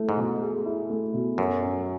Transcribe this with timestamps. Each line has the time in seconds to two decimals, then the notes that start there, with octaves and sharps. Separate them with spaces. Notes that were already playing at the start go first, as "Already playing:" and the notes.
Already playing: A3 E4
0.09 G#2
0.17 B2
0.41 G#4
0.66 E4
0.90 A3
1.14 B2
1.38 F#2 F#4
1.62 C#4